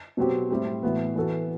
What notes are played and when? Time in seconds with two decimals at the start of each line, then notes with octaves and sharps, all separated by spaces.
0.17 B2 F#3 C4 G4
0.50 A2 G3 C4
0.83 A2 E3 B3 F#4
1.16 E3 B3 F#4 A4